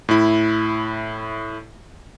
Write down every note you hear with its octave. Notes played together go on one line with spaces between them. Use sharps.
A2 E4